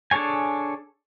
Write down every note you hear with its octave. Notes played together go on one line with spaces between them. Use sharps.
D4 G#4 A4 C#5 G#5